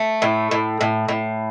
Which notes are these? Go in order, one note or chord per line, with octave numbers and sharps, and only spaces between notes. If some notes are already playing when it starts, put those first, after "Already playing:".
Already playing: A3
A2
A2
A2
A2